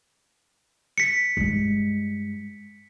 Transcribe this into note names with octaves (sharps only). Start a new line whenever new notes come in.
B6 C#7
G2 G#3